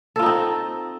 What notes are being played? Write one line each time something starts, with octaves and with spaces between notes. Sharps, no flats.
C4 D#4 F4 A4